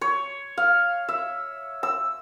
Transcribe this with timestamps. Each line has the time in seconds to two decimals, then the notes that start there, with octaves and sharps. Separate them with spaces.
0.01 C#5
0.57 F5
1.08 E5
1.83 E6